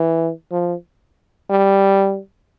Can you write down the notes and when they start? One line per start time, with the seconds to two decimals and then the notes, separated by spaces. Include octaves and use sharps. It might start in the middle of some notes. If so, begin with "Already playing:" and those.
Already playing: E3
0.51 F3
1.50 G3